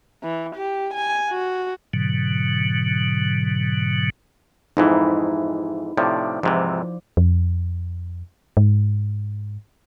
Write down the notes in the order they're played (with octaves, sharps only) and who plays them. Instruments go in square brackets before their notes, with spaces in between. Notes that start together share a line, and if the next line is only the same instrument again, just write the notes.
[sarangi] E3
G4
G#5
F#4
[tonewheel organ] G#2 B2 D3 F#3
[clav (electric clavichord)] F2 G#2 E3 [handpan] D#4 E4
[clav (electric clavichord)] A2 C3 F3 [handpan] D5
[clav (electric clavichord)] G#2 C3 E3 [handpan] F3
[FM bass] F2
G#2